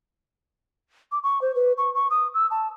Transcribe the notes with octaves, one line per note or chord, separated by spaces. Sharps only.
D6
C#6
C5
B4
C#6
C#6
D#6
E6
A5